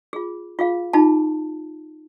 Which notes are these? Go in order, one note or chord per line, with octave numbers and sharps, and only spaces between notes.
F4 G#4
F4 G#4 F5
D#4 F4 G#4 A5